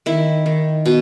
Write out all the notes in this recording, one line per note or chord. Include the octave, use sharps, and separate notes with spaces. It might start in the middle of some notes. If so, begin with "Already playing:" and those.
D#3 E4
D#3
B2